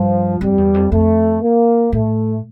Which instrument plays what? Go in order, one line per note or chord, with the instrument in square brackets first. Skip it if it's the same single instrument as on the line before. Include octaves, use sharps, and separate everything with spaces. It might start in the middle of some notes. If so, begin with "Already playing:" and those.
Already playing: [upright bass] G2 [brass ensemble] F3
[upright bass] F2 [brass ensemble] G3
[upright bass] E2
F2
[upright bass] F2 [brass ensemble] A3
[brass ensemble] A#3
[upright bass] A2 [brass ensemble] A3